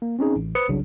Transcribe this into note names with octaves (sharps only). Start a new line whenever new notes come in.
A#3
C4 C#4 D#4 G#4
A1
B4 C5 D#6 C#7
G1 C2 C#3 F#3 D4